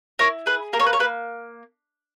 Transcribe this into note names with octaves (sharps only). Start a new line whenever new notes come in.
E4 A#4 C#5
G#4 B4
A#3 A#4
C#5
B4
C#5
A#3 B4